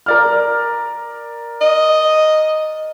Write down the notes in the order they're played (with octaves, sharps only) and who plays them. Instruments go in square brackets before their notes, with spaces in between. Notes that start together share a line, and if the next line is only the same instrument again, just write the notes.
[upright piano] A#4 D5 F6
[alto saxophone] D#5